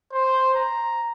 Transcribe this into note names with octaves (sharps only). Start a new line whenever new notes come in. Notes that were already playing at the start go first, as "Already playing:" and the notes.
C5
A#5